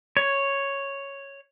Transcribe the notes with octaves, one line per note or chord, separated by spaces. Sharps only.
C#5